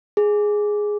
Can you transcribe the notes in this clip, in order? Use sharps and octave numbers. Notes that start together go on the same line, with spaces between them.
G#4